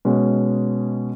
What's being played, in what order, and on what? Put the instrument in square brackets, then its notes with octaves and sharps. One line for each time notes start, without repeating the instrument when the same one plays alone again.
[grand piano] B2 G#3 C#4